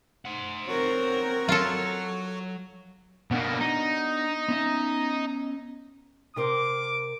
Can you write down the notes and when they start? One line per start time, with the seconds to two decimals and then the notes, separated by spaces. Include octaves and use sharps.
0.25 C5 F#5
0.67 C4 F#4 A#4 C#5
1.49 F#3 F4 A4
3.31 B2 A#3 B3 D4 F#4
3.61 D#4
4.48 B3 C#4 E5
6.36 C3 A#4 C5 D6